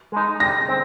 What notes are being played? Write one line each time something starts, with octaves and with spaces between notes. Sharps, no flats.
G#3 D#4
G3 A#6
C4